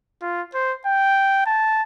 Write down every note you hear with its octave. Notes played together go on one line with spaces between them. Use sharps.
F4
C5
G5
A5